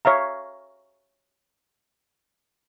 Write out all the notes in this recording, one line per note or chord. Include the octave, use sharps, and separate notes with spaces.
C#5 E5 F5 A#5